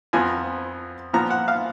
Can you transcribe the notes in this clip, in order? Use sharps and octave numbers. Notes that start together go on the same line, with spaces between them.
F2 F3 B3 G#5
A#2 F3 B3 A#5
F#5
F5